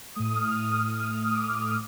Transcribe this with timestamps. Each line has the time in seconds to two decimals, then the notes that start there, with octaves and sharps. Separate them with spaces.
0.15 A2 A3 D#6
0.36 F6
0.55 D#6
1.35 D6
1.63 D#6